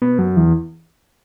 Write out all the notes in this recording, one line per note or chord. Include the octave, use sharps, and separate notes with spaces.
B2
F#2
E2